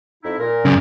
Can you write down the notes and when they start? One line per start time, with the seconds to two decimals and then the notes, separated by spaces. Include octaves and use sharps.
0.24 F2 D#4 E4
0.39 A#2 A#4
0.65 F#2 C#3